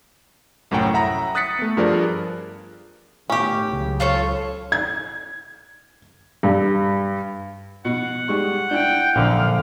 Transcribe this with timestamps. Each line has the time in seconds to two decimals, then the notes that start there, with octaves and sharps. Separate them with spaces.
0.71 C2 F#2 A2 C#4 F#5 G5
0.94 E5 F#5 A#5 B5 D#6 A#6
1.35 D#6 F#6 A6 B6 C#7
1.59 A3 B3
1.77 G2 F3 G#4 A#4 D5
3.30 A2 D#3 B3 C#4 G4
3.68 C#2 C#3 F#3
4.00 F4 A4 C#5
4.72 G#6
6.43 G2
7.85 B2 F#5
8.28 G3 G#3 C#6
8.71 D4 E4 G5
9.16 A#1 F#2 D3 F5